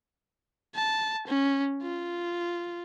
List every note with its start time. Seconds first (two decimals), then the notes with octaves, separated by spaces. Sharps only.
0.75 A5
1.27 C#4
1.82 F4